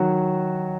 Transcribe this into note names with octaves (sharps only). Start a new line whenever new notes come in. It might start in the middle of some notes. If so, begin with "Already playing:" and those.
Already playing: D#3 F#3 F#4